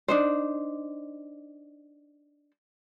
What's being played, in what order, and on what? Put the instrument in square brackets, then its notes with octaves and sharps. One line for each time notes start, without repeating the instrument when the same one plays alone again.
[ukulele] D4 D#4 C5